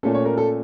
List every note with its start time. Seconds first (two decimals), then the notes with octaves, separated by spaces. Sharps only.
0.03 A#2 A3 C#4 A4
0.14 C#5
0.25 A#4
0.38 A4